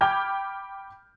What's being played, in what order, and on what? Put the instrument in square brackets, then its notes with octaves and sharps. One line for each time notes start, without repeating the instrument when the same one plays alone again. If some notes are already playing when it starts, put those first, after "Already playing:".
[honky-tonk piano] G5 B5 D6 F6 G6 G#6